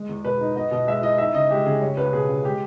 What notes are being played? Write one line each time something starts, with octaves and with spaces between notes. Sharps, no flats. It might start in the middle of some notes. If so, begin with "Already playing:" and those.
Already playing: G#3
E2
B2 B4
D#4
B3 D#5
B2 D#5
G#3 E5
E4 D#5
D#4 E5
C#3 D#5
G#3 G4
C#3 G#4
G3 C#5
C#2 B4
B2 G#4
C#2
G#3 G4